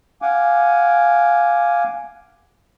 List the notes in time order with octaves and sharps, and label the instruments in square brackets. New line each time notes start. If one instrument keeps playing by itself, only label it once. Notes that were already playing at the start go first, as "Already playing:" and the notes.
[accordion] F5 F#5 G#5 D6